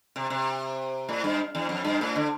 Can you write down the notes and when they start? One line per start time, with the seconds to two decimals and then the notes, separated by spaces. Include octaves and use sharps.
0.16 C3
0.30 C3
1.09 A2
1.24 G2
1.55 E2
1.69 F2
1.84 G2
2.01 A2
2.16 D3